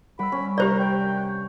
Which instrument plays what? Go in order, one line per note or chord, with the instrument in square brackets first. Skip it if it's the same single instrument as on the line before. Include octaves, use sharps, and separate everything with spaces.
[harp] G3 E6 [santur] F#5 D6 [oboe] B5
[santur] C#4
[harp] C3 D4 [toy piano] G4 C5 D5 [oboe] A#4 [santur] E5 C#6
[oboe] G5 [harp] D6 D7
[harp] F#6